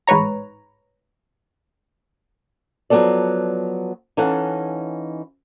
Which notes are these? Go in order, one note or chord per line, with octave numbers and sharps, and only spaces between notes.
A1 G#2 B4 C#5 A#5
F3 F#3 A#3 B3 A4 D5
E3 C#4 D#4 A4 F5 F#5